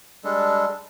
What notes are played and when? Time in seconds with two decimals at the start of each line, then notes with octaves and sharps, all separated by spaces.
0.24 G3 G#3 D4 A4